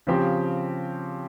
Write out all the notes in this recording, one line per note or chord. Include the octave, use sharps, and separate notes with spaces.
C#3 F3 C4 G4